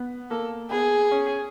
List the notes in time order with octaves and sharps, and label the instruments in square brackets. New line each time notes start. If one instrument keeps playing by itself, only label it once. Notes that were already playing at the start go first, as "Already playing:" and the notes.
Already playing: [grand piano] B3
[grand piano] A#3 [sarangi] A4
[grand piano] B3 [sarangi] G#4
[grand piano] C#4